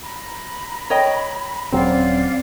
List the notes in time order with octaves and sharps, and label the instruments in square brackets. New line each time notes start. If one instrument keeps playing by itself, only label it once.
[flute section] A#5 B5
[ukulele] C#5 D#5 G5
[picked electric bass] D#1 F#3 C#4 [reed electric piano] C4 [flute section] D5 F5